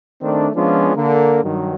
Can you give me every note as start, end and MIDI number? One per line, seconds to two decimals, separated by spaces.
0.22 0.49 51
0.22 0.49 57
0.22 0.49 60
0.22 0.49 62
0.55 0.92 53
0.55 0.92 56
0.55 0.92 59
0.55 0.92 61
0.55 0.92 62
0.55 0.92 65
0.96 1.41 50
0.96 1.41 58
0.96 1.41 70
1.44 1.76 43
1.44 1.76 51
1.44 1.76 54